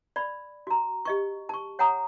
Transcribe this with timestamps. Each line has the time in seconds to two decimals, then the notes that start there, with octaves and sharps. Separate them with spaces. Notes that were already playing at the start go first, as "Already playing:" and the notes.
0.16 D5 B5
0.67 F#4 A#5
1.05 G4 D#5 C#6
1.49 A5 C#6
1.79 C#5 F#5 G#5 A#5 D#6